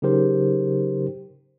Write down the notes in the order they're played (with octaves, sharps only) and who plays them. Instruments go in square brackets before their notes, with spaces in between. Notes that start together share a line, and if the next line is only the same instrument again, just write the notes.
[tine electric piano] C#3 F#3 D#4 G4 A#4 C5